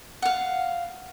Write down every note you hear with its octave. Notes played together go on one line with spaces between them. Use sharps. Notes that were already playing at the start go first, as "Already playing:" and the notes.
F5 F#5